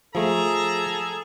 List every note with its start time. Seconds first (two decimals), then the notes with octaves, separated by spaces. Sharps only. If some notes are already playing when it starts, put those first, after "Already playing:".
0.15 F3 A3 G#4 A4 A#5